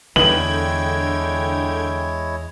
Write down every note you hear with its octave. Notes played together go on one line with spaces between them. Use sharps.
E2 D3 G#3 E4 C#5 G5 G#6 F#7